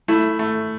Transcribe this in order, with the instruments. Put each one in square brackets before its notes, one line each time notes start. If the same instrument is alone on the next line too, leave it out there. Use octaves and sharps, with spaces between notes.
[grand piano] A3 [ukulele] E4
[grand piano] A3